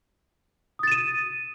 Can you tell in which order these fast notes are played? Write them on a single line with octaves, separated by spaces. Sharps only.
D#6 A6 E7 D#7